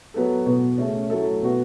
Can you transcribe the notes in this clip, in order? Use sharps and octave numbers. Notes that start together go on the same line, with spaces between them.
F#3 B3 A4
B2 B3 F#4
C#3 A3 C#4
F#3 A3 E4 A4
B2 B3 F#4